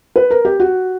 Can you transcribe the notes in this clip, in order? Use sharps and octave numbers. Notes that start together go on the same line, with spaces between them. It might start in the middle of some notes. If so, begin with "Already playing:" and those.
B4
A#4
G4
F#4